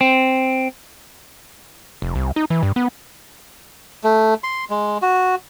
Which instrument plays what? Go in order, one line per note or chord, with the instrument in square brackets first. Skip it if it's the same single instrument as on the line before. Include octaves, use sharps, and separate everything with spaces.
[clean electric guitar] C4
[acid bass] F1
C2
D#4
E3
G2
B3
[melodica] A3
C6
G#3
F#4